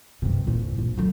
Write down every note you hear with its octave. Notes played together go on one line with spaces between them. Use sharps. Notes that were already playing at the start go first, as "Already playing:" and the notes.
G2 C3
C2 A#2
A#1
D3 F#3